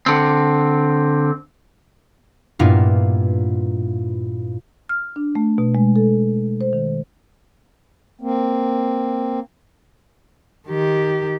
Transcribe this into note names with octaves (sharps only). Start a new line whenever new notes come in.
D3 C4
G2 A#2 A#3 B3 E4 F4
F6
D4
A3
B2
G#3
A4
C5
D#3
A#3 C4
D#3 G4